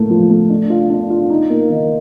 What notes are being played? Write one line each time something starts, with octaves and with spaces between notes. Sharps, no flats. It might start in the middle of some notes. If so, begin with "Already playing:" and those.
Already playing: A2 A3 A#3
F3
A3
D4
F4
D4
F4
D#4
A#3
D#3